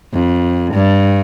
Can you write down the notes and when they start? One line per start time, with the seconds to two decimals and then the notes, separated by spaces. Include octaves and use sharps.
0.13 F2
0.74 G2